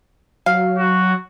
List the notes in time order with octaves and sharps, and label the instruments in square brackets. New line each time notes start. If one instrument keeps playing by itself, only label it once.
[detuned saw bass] F#3 [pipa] F5
[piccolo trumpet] F#4